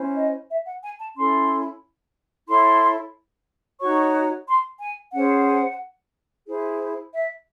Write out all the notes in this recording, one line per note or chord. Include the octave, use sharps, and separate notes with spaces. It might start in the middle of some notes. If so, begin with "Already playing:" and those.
Already playing: C#4 E4 C5
D#5
E5
F#5
G#5
A5
C#4 E4 A4 C6
E4 A4 C#5 C6
D#4 F#4 C#5 C#6
C6
G#5
C#4 G#4 C5 F#5
E4 G#4 C5
E5